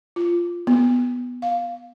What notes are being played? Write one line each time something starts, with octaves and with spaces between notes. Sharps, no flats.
F4
B3
F5